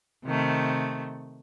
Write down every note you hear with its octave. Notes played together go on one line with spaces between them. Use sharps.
C3 D#3 A3